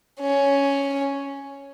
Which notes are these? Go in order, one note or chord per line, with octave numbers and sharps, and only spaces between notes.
C#4